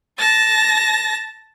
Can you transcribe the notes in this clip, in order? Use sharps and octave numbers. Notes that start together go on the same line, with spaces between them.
A5 A6 A#6